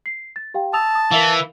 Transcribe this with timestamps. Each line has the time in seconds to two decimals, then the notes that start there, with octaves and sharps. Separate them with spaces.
0.06 C7
0.36 A6
0.54 G4 F5 G5
0.73 A5 D#6 E6 F7
0.95 D#6
1.11 E3 A#4 E5 F5